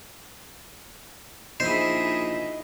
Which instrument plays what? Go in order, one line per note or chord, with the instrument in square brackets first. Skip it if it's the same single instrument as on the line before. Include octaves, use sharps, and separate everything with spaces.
[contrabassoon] A#1 [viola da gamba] D#4 E4 G#4 [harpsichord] C5 [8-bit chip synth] D#5